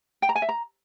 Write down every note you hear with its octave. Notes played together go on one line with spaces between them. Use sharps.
G5
A#5
G#5
E5
A#5